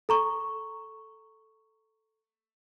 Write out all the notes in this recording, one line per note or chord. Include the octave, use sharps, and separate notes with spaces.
A4 A#5 C#6